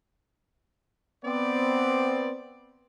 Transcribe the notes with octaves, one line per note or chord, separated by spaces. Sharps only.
B3 C4 D5